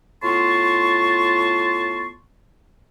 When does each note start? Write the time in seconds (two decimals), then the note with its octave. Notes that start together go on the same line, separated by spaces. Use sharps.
0.23 A2 B3 F4 A5 C6 C#6